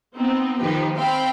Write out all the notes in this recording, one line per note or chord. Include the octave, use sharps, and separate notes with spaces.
B3 C4 D#4
D#3 F3 D#4 G4 B4
C4 C5 F5 G5 B5